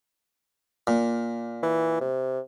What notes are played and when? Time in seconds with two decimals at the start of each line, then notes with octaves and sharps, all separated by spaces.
0.87 A#2
1.63 E3
2.01 C3